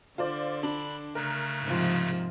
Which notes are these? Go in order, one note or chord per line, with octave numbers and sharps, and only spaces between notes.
D3 F4 C5 D5
D4 B5
C#3 A3 A#4 F#6
G#2 C3 F3